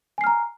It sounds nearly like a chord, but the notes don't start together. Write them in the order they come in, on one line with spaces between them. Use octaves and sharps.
G#5 C7 F6 A#5